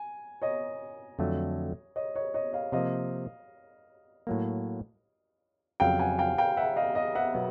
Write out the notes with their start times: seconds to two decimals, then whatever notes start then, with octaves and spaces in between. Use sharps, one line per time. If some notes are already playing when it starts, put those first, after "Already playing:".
Already playing: G#5
0.42 C#5 D#5
1.19 F2 D3 F#3 A3
1.96 C#5 D#5
2.15 C#5 D#5
2.34 C#5 D#5
2.53 D#5 F5
2.72 C3 F3 A#3 D#5 F5
4.27 A2 F#3 A#3
5.80 F2 C#3 F#3 F5 G5
5.99 F#5 G#5
6.18 F5 G5
6.38 F5 G5
6.57 E5 F#5
6.76 D#5 F5
6.95 D#5 F5
7.15 E5 F#5
7.34 B2 F#3 B3